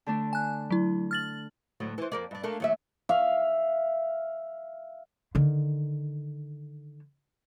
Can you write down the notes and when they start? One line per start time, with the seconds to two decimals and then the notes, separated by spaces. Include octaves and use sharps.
0.06 D3 A3 D4
0.33 G#5 F#6
0.70 F#3 E4
1.11 F6 A6 F#7
1.80 D2 A2 F#3
1.98 E3 C5
2.12 F2 A#3 D5
2.31 G2 D4
2.43 A3 A#3 D4
2.60 D#2 F#3 E5
3.09 E5 F5
5.35 D3 D#3